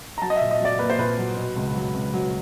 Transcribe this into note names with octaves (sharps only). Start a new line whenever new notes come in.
A#5
F#3 A5
D#5
A#2 E5
D#5
F#3 D5
A#3 B4
C5
A#2 B4
F#3
B2
C#2
F#3
C#2
F#3